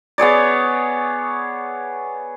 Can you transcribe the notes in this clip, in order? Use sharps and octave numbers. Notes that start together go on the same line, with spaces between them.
B3 G#4 C#5 D5